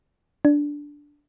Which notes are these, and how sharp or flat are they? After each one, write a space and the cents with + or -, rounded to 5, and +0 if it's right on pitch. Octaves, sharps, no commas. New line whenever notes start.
D4 -5